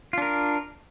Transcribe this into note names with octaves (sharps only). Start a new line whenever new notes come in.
D4 F4 A#4